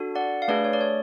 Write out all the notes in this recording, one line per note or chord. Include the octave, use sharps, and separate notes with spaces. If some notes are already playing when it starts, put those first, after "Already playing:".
Already playing: D4 F#4 A4
D5 F#5
F5
A3 D4 G#4 B4 D5
C#5
D5
C#5